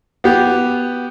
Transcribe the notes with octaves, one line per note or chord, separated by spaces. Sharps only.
B3 G4